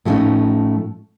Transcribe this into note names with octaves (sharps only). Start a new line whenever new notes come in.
A2 F3 G3 A3 C#4 D#4